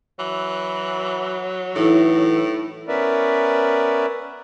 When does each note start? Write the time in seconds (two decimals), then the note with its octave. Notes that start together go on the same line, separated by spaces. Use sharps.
0.19 E3 F#3
1.76 A2 E3 D#4 E4 A4
2.88 B3 C#4 A#4 B4 D5 E5